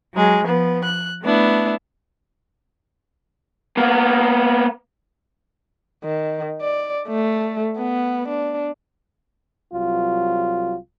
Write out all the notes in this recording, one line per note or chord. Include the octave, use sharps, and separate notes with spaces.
F#3 G#3
F3 B3
F#6
A3 B3 D4 E4
A#3 B3
D#3
D5
A3
B3
D4
C2 F#3 F4